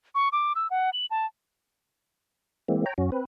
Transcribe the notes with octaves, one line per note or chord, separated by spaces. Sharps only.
C#6
D6
E6
F#5
F#7
A5
E3 G#3 A#3 C4
C#5 G5 A#5
F#2 C#4 F#4
C4 B4